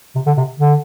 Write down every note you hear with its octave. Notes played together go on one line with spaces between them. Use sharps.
C3
D3
C3
D3